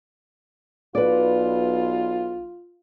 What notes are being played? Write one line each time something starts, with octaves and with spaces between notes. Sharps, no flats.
B1 F4 B4 D5